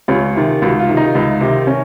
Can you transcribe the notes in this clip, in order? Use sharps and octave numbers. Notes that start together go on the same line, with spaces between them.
C#2 C#4
C3 D#3
C#2 F#4
F4
C3 D#3
D#4
C#2
C3 D#3
C#4